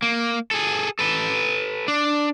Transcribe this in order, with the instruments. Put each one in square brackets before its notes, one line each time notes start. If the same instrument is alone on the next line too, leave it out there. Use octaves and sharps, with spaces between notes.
[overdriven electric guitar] A#3
G#4 A4
A4 B4
D4